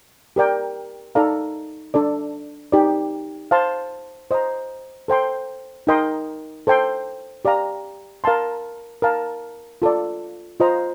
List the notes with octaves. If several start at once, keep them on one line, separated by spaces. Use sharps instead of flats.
G4 A#4 D5 G5
D#4 A4 D5 F5 A#5
D4 A4 D5
D#4 G4 D5
C5 F5 A5 C6
C5 D#5 A#5
A4 C5 G5 C6
D#4 A#4 D#5 G5 C6
A4 C5 G5 C6
G4 D5 F5 A#5
A#4 F5 A5 C6
A#4 F5 A5
F4 A4 D5
F4 C5 D#5 A#5